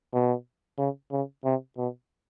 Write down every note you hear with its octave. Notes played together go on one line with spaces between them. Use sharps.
B2
C#3
C#3
C3
B2